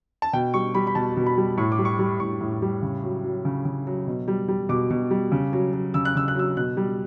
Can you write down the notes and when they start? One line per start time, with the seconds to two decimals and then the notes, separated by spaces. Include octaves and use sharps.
0.22 A5
0.33 B2 G5
0.54 G3 C#6
0.75 G3 B5
0.87 B5
0.95 B2 A5
1.17 B2
1.26 B5
1.38 G3
1.57 A2 C#6
1.72 D6
1.79 G3
1.85 C#6
1.99 G3
2.20 A2 C#6
2.41 A2
2.62 G3
2.82 C#3
3.03 F#3
3.24 F#3
3.45 C#3
3.65 C#3
3.87 F#3
4.07 B2
4.28 G3
4.48 G3
4.69 B2 D6
4.90 B2
5.11 G3
5.32 C#3
5.53 F#3
5.73 F#3
5.94 C#3 E6
6.05 F#6
6.15 C#3 E6
6.28 F#6
6.35 F#3 E6
6.57 B2 F#6
6.77 G3